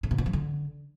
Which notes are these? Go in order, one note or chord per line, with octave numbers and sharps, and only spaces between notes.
A2
B2
A#2
F3
D3